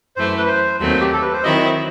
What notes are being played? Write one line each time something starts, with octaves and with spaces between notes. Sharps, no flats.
F#2 E3 A3 C5
B4
C5
D#2 D#3 F#3 A3 C4
G4
A4
B4
C5
D#3 F#3 C4 E4 D#5